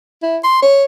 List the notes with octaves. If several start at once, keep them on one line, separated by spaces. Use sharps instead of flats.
E4
C6
C#5